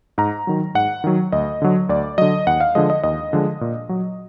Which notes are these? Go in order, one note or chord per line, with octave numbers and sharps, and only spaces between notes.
G#2 A#5
D#3 F#3
G#2 F#5
D#3 F#3
D2 D#5
D3 F#3
D2 D5
D3 F#3 D#5
D#2 F#5
F5
D3 F3 G#3 D#5
D#5
D#2 D#5
D3 F3 G#3
A#2
F#3